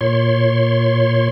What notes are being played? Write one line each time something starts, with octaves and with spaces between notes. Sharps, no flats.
A#2 C#5 C6